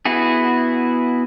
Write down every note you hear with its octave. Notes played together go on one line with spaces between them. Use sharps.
B3 E4 F#4 G#4